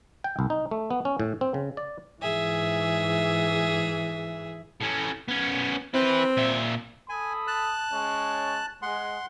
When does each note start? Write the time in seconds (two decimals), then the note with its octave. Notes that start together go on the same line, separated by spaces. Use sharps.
0.24 G5
0.39 C2
0.50 D#4
0.71 A3
0.90 B3
1.05 C#4
1.20 A2
1.41 C4
1.54 C#3
1.77 D5
2.22 G#2 E3 G#4 E5
4.81 A2 C#4
5.28 B3 C#4
5.94 C4 E4 B4
6.37 A#2 E5
7.09 A4 G#5 B5 D#6
7.47 A5 F#6
7.91 G#3 C#4 C#5
8.82 G#3 F#5 C6